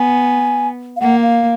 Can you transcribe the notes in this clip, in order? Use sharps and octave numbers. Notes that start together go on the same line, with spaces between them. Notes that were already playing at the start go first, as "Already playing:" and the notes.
Already playing: B3 G#5
F5
A#3 F#5
F5